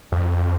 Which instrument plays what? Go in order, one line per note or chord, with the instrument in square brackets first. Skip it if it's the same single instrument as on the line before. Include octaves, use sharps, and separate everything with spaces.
[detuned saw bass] F2